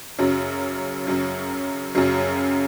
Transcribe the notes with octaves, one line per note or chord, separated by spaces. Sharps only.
F#2 C#3 F#3
F#2 C#3 F#3
F#2 C#3 F#3